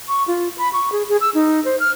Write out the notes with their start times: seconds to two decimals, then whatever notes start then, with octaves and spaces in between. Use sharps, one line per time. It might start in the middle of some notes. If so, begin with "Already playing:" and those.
0.08 C#6
0.28 F4
0.58 B5
0.73 C#6
0.92 G#4
1.09 G#4
1.21 E6
1.34 D#4
1.65 C5
1.80 F6